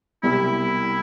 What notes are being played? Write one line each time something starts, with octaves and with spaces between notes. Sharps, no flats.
C2 B2 G3 E4